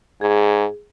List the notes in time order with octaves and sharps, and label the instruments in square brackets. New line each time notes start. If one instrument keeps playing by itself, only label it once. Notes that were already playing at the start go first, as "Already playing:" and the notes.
[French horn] G#2 [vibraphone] G#4